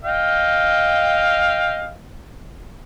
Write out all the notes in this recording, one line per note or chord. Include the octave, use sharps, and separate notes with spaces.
D#5 F5 G5